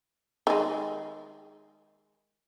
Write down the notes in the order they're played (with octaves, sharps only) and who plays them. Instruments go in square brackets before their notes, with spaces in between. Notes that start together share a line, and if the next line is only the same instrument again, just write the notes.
[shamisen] D#3 G#3